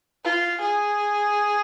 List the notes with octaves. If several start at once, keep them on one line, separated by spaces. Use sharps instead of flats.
F4
G#4